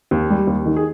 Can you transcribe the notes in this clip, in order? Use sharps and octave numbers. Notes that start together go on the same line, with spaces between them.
D#2
G3
D#2
D#3
G#4